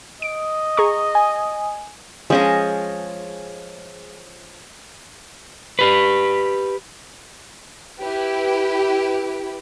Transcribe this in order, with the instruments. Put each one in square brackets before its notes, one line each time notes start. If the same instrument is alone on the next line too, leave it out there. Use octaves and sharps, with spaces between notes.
[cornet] D#5 [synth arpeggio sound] D7
[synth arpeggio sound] G#4 A#5 C#6
[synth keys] G#5
[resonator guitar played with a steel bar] F3 C#4 [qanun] G#3 D#5
[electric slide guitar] G4 B4
[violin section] E4 G4 B4